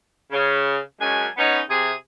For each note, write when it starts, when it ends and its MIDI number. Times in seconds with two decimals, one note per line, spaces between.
0.32 0.79 49
1.00 1.28 42
1.00 1.28 56
1.00 1.28 61
1.00 1.28 62
1.00 1.28 80
1.37 1.59 59
1.37 1.59 61
1.37 1.59 63
1.69 1.92 48
1.69 1.92 68